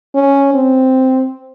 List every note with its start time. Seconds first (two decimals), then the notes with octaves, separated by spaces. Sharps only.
0.15 C#4
0.54 C4